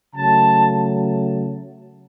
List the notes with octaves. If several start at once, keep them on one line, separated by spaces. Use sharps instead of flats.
C#3 F#3 A3 A5